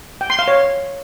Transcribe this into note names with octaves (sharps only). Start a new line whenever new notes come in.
G5
C6
F5
C#5